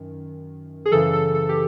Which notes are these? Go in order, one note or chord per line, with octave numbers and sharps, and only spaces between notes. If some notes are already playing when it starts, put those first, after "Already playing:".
Already playing: F#2 D#3
G#4
F#2 C#3 E3 A4
A4
A4
G4